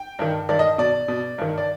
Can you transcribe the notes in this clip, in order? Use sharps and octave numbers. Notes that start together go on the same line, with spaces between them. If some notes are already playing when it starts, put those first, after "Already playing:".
Already playing: G5
G2 D#3
G2 D#3 D5
D#5
B2 D5
B2
G2 D#3
D5